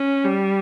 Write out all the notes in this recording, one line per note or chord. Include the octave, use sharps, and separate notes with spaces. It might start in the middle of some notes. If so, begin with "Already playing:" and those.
Already playing: C#4
G3